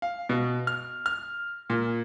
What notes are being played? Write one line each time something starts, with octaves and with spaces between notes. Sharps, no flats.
F5
B2
F6
F6
A#2